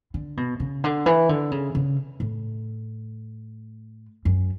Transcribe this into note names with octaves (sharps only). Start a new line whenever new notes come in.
D3
B2
C#3
D3
E3
D3
C#3
C#3
A2
F#2